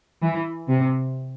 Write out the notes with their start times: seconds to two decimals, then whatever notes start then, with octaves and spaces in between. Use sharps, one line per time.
0.22 E3
0.68 C3